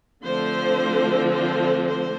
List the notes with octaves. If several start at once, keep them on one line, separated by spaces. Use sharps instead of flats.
D3 F3 A3 C4 C5
C5
C5